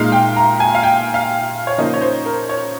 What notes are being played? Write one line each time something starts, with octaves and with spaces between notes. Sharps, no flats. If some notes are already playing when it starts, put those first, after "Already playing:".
Already playing: A#2 G#3 D#4 F5
G5
A#5
G#5
F5
G5
F5
C#5
C#3 F3 A#3 D#4 D#5
C#5
C5
A#4
C#5